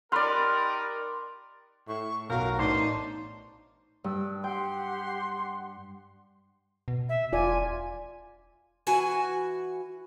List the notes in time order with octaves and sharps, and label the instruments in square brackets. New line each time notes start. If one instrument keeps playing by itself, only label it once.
[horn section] D#4 G4 A#4 [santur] D5 C6 [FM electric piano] B5 F6 F#6
[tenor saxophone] A2 [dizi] C#6
[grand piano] B1 F#4 [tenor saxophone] A#4 [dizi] F5
[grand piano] A1 [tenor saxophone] D4 [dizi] D#4 [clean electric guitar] C5
[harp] G2 [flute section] D6 E6
[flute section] G4 F#5 C6 [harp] G5
[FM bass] B2
[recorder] E5
[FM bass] E1 [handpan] F4 D5 [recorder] G#5
[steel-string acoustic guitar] E3 F#4 F#5 G#5